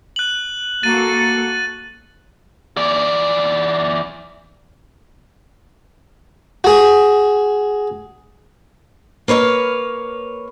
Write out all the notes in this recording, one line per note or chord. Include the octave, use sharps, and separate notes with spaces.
F#6 F#7
A#3 F#4 A4 A6 D#7
E3 D5
F#4 G#4
A#3 B4 C#5 D#5 F5